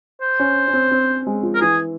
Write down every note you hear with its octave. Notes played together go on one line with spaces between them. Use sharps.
C5
C#4
C#4
C4
C4
G#3
F3
A#4
E3 G#4